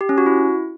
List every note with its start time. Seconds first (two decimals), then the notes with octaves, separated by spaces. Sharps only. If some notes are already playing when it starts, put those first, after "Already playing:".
0.01 G4
0.09 C#4
0.18 F#4
0.26 E4